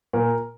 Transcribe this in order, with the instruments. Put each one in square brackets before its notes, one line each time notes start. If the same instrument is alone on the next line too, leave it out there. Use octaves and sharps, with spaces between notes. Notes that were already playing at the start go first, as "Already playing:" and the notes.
[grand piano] A#2 A#4